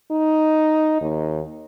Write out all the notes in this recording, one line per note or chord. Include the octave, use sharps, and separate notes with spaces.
D#4
D#2